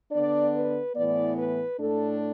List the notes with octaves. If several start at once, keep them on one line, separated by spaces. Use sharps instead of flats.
D3 B3 D4 D5
B4
A2 E3 B3 D5
B4
A2 A3 D4 A4